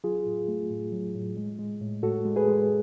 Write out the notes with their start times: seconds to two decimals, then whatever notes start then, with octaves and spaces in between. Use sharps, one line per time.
0.04 F#3 F4 G#4
0.26 A2
0.48 A3
0.70 A2
0.92 F#3
1.15 A2
1.37 G#3
1.59 G#3
1.81 A2
2.03 A2 F#4 A4
2.25 G#3
2.36 G#4 B4
2.48 G#3